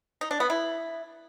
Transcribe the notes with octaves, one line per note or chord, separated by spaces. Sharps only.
D#4
D4
B3
E4